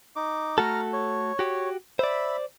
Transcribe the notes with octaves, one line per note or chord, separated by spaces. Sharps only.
D#4 D6
A3 F#4 A4 A#5 F6
C#5
F#4 G4
C5 D5 E5 B5